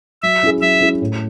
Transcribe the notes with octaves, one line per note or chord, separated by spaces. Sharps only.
F#3 E5
C#4 E4 G#4
F#3 E5
C#4 E4 G#4
A2